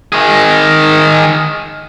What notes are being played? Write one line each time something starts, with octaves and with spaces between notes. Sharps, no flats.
D#3 G#4